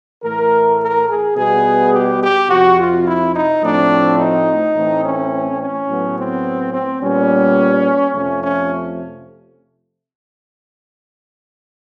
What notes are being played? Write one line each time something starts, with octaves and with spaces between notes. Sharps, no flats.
A2 E3 A3 A#4
A#4
G#4
B2 G3 B3 G#4
G4
G4
F2 C3 F3 F#4
F4
E4
D#4
A2 F3 A3 C4 D4
D#4
A2 E3 A3 C4
C#4
C#4
A2 F#3 B3
C4
C4
A#2 G3 B3 C#4
F2 C3 F3 A3 C#4
C#4